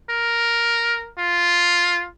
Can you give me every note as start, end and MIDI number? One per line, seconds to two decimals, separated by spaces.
0.10 1.09 70
1.18 2.06 65